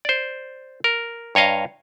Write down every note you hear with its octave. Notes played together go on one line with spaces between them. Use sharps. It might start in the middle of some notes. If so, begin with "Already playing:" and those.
C5 D5
A#4
G2 C#5 D#5 F5 A#5